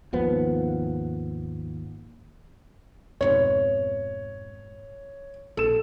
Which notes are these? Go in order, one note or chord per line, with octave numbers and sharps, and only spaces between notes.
G#1 D#2 F3 B3
F2 G#2 B2 C#5
A#1 A4 E7